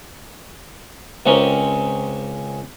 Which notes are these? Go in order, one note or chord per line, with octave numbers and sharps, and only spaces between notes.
C#2 C4 C#4 A#4